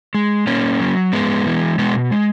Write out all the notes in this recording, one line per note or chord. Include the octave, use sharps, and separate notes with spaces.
G#3
A#2 A#3 C#4
F#3
G#2 G#3 B3
E3 G#3
B2 G#3 B3
G#3